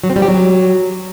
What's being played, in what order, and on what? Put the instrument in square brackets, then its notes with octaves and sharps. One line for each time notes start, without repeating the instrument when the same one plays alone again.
[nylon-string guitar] F#3
C4
G3
G4
F#3